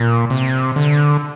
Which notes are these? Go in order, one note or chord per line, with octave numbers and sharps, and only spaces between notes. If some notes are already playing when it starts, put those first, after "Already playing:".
Already playing: A#2
C3
D3